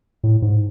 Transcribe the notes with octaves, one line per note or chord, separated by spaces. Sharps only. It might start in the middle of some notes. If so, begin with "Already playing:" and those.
A2
G#2